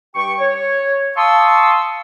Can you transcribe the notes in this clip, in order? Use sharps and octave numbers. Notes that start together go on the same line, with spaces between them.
G2 G4 G5 C#6
C#5
F5 A5 C6 C#6 D#6 E6